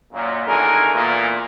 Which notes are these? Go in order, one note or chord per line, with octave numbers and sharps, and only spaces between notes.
F#2 A#2
E2 D3 D#3 G#4 A#4
E2 A#2